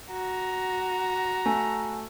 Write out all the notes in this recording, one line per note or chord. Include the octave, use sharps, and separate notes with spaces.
F#4 A#5
A3 G#5